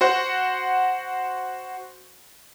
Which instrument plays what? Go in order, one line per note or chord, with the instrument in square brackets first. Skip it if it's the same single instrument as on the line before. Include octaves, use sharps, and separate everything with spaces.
[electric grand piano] F#4 C5 F#5